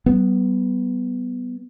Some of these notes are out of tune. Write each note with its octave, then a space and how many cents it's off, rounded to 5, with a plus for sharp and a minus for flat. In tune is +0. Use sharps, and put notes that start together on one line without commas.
G3 -45 B3 +0